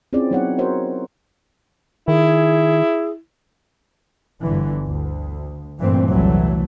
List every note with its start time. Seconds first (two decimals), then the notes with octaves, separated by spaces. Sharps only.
0.13 C4 C#4 E4 F4 G#4 D5
0.31 F#3 B3 D#4 C#5 D5 F#5
0.58 F#4 A#4 C5 C#5 E5
2.08 D#3 E4 G#4
4.41 G1 D3 E3
4.87 D2
5.79 G2 A#2 E3 A3 C4
6.10 F1 C2 E3 F#3 A3